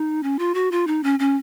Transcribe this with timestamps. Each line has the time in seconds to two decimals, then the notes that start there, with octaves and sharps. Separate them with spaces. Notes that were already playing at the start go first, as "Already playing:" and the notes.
Already playing: D#4
0.23 C#4
0.39 F4
0.54 F#4
0.72 F4
0.87 D#4
1.03 C#4
1.19 C#4